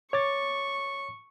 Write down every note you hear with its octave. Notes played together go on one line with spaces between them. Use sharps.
C#5 C#6 D6 A6